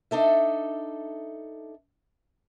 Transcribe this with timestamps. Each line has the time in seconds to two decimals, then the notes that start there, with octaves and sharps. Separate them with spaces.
0.11 D4 D#4 A4 E5